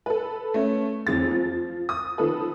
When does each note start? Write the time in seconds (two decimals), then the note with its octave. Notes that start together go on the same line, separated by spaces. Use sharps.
0.06 A4 B4
0.54 A3 C#4
1.07 F2 E3 G#4 A6
1.31 F3
1.89 D#6
2.18 D#3 F3 A4 B4